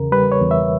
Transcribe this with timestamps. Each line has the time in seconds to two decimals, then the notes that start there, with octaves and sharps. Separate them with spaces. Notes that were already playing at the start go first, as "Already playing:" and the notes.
Already playing: E2 C#3 A#4
0.12 G3 B4
0.32 C#5
0.41 E2
0.51 E5